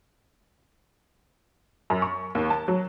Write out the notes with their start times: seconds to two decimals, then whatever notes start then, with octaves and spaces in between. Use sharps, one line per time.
1.90 F#2
2.02 C#6
2.35 D#2
2.50 A5
2.68 F#3